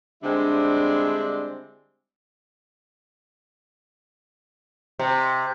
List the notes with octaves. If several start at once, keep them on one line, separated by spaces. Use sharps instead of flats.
D3 G3 G#3 C4 D4 E4
C3